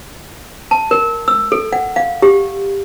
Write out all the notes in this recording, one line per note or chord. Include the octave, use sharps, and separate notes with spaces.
A5
A#4
E6
A4
F#5
F5
G4